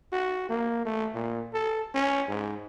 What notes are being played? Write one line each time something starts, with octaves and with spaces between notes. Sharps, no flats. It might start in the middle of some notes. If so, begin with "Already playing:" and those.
F#4
A#3
A3
A#2
A4
C#4
G#2